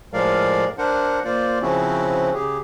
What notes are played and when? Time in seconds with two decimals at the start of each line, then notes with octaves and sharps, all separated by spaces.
0.13 A2 F3 G#3 A#4 D5 F5
0.78 D4 A#4 C5 F#5
1.24 A#3 F4 C5 D5
1.62 C#3 F3 C4 C#4 E4 F#4
2.34 C#3 G4 G#4